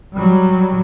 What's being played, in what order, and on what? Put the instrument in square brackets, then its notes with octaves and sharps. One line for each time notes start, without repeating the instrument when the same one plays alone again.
[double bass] F#3 G3